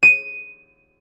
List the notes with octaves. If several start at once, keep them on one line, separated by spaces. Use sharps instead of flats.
D#7